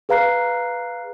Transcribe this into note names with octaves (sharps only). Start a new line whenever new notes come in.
G#4 B4 F5 A#5 F#6 C7